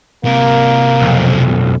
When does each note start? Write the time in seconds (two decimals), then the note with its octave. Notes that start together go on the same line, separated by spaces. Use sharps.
0.25 C3 A#3 A#4
1.02 B1 F2